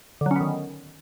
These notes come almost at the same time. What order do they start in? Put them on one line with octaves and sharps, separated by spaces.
D3 F#3 C#4 B3 D#3